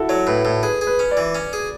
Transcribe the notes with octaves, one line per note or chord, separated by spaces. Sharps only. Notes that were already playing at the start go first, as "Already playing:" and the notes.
Already playing: E4 F#4 A4
F#3 C#5
A2 B4
A2 A4
G#4 B4
G#4
B4
C#4
D5
E3
C#4
G#4